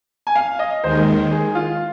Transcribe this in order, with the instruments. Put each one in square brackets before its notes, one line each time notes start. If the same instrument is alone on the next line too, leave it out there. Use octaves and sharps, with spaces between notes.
[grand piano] G#5
F5
D#5
[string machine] D#2 D#3 G#3 [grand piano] C5
[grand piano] G#4
F4